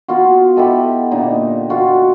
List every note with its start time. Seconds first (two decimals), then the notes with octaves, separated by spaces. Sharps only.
0.08 B3 F4 F#4
0.56 E4 G4 A4 D#5
1.11 A#2 D3 D#4
1.69 F4 F#4 A4